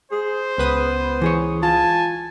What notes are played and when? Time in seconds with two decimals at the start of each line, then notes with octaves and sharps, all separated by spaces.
0.12 G#4 C5
0.58 C#2 B3 B4 D#6
1.21 E3 G#4 C#5
1.63 F4 G#5 A5